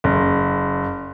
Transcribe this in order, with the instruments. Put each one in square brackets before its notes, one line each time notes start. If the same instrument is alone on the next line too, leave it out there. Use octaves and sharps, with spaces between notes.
[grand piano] F#1